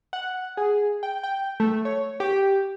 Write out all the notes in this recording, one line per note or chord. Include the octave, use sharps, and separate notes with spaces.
F#5
G#4
G5
G5
A3
C#5
G4